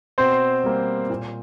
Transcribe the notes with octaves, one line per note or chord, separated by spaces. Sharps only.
B2 C4 C5
G3 A#3
A#2